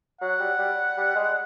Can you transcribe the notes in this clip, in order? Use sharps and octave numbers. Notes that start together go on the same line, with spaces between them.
F#3 F#5
G3
G3
G3
G#3